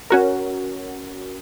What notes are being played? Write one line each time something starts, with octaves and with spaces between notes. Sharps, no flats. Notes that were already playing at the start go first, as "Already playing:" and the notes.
C#4 F#4 A#4